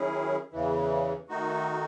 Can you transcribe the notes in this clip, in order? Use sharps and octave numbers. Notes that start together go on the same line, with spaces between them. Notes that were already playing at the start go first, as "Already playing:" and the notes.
Already playing: D#3 F#3 C#4 E4 G#4
E2 C#3 E3
D#3 A3 D#4 F#4